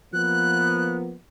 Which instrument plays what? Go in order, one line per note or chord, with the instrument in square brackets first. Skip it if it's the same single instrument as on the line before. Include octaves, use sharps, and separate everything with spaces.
[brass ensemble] F3 A#3 B3 [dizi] F#6